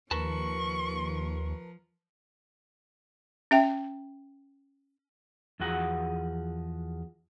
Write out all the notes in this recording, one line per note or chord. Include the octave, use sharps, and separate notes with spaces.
D#2 F3 A#4 B4 A5 C#6
C#4 E5 G5
E2 F3 F#4 G#4 F#5 A#5